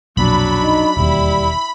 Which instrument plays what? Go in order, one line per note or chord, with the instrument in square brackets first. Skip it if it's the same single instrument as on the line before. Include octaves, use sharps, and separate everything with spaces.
[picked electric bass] B1 F2 A#2 [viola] F#3 D4 [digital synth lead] B5
[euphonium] D#4
[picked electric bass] E1 D#2 [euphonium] G3 [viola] E4